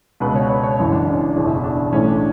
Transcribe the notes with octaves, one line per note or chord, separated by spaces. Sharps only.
C#2 B2 B4
C#5
C#5
C#5
F#1 F#2 E3
D4
C#4
D4
F#1 E2 B2
E4
D4
B1 A2 E3 C#4
D4